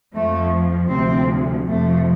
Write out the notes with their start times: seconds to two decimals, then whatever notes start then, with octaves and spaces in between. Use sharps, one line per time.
0.14 F2 F3 A3
0.91 D2 C3 F3 C4
1.68 F2 C3 F3 A3